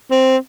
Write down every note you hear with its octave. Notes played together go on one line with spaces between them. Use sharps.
C4